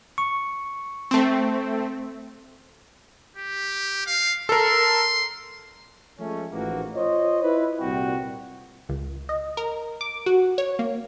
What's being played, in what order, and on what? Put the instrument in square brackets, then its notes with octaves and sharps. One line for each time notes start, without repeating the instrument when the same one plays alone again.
[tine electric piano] C#6
[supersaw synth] A3 C4
[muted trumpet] G4
F5
[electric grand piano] A4 A#4 [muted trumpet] C6
[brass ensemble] F3 G#3 A3 C#4
A1 G#2 E3 F3 A#3 F#4
F4 C5 C#5 D#5
E4 B4
C2 A#2 G3 C4 F#4 G5
[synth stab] C#2
D#5
A#4
D6
F#4
C#5
A#3